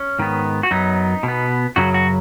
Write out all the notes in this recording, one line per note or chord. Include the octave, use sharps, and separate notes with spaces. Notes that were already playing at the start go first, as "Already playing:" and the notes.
Already playing: C#4
G#2 D#3 B3
F#4
F#2 F#3 B3 D#4
B2
B3
F#2 C#3 F#3 F#4
F#4